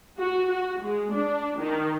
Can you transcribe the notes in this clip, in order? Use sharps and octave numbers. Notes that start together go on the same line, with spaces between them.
F#4
F#4
G#3
D4
D#3